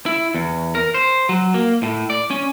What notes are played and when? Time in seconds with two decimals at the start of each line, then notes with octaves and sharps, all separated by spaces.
0.06 E4
0.34 E2
0.75 A#4
0.94 C5
1.29 F#3
1.54 A#3
1.83 A2
2.10 D5
2.30 C#4